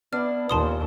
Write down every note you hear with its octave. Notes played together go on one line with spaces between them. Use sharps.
B3 D4 E4 F6
D#2 A#2 A5 C6 D#6